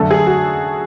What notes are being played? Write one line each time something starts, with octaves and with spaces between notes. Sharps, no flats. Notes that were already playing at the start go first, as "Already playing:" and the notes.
Already playing: F#2 D3 A3 A4
G#4
F#4